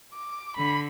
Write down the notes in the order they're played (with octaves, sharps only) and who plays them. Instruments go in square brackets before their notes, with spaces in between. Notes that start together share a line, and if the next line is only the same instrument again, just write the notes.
[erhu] D6
[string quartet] D3 [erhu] B5